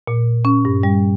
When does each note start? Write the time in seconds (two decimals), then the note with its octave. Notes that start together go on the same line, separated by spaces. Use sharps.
0.08 A#2
0.45 C#4
0.65 G2
0.83 G3